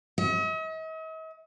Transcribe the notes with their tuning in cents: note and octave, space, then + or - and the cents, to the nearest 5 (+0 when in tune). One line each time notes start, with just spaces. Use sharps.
D#5 +45